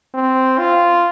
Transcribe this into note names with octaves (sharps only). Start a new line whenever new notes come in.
C4
F4